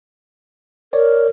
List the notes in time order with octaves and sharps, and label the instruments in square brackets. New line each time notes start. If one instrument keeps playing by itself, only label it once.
[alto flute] A#4 [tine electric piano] C#5 D5